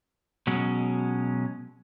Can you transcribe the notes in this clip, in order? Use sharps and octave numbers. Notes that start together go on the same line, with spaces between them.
B2 F#3 G#3 C#4